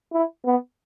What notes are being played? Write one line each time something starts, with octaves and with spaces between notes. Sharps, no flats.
E4
B3